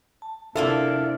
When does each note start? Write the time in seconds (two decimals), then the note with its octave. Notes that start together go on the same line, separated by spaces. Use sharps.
0.22 A5
0.56 C3 A#3 D4 E4 F4 A4 E5